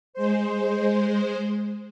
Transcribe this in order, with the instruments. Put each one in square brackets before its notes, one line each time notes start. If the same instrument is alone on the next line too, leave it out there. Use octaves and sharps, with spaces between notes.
[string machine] G#3 C5